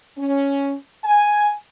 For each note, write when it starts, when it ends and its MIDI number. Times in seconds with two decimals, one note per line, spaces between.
0.18 0.75 61
1.05 1.52 80